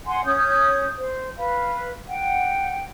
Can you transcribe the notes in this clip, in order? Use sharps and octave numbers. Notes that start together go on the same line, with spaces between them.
F#5 G#5 C6
C#4 C#5 D#6 G6
C5
B4 F5
F#5 G5